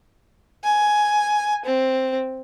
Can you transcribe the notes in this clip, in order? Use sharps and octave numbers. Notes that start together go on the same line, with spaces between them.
G#5
C4